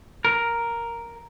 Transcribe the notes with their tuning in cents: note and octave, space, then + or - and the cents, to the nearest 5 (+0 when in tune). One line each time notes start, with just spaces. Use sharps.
A#4 +0